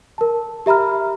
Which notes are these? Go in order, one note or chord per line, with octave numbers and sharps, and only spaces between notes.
A#4 A5
G4 E5 A#5 B5 F6